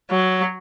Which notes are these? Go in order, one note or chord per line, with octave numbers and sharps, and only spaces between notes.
F#3